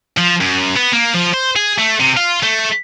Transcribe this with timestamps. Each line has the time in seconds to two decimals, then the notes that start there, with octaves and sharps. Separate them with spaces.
0.18 F3
0.41 F#2
0.76 B3
0.92 A#3
1.14 F3
1.34 C5
1.56 G#4
1.78 A3
2.00 C3
2.17 F4
2.43 A3